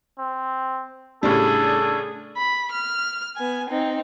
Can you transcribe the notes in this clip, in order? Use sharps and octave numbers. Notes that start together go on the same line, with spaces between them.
C4
A2 C#3 G3 D4 G#4 A4
B5
F6
B3 G#5
C4 D#4